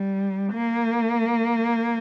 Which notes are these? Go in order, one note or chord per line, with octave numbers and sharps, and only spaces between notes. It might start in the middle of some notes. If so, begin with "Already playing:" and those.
Already playing: G3
A#3